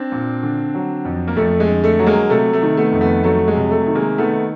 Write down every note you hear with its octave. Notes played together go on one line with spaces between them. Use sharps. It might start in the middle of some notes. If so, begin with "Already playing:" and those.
Already playing: C4 D4
A#2
D3
F#3
F2
A#3
F2 A3
G#3
D3
A3
F#3
G#3 A#3
C3 A3
A3
D#3
A3 B3
F2
A3 B3
F#3 A3
G#3
C3
A3
D#3
G#3 A#3
D#3 A3 B3